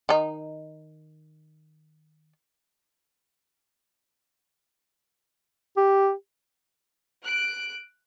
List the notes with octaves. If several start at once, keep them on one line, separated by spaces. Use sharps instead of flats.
D#3 D#4
G4
F#6 D7